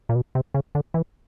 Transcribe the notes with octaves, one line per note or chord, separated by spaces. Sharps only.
A#2
B2
C3
C#3
D3
E3